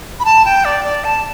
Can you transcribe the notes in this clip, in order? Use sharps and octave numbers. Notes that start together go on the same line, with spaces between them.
B5
A5
G5
D5
D5
A5